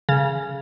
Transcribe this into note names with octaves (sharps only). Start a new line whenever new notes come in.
C#3